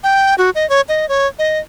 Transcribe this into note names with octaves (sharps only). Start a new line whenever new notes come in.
G5
F#4
D#5
C#5
D#5
C#5
D#5